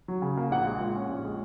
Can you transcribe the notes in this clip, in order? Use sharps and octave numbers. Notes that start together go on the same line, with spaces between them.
F#3
C#3
A#3
A#1 F#5
G#3
A#2
C#4
A#1
G#3